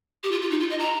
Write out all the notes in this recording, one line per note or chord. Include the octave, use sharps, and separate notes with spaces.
G4
F4
F4
D#4
F4
D#5
A#5